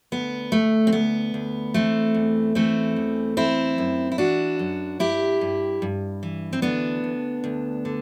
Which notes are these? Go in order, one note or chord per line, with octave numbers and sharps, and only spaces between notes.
D2 B3
D2 A3
C4
D2 B3
D2
E3 A3 C4
E2
E3 A3 C4
E2
E3 C4 E4
F#2
E4
E3 D4 F#4
F#2
G2 E4 G4
G2
G2
E3
C4
D2 B3 D4
D2
D2
D3